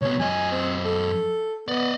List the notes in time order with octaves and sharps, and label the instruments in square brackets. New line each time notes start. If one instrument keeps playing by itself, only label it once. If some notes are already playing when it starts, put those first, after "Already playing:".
[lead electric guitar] C2 B3 [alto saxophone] C#5
[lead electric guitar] F#2 D#5 [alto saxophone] G#5
[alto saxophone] C4
A4
[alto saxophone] B3 [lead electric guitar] D5 D#5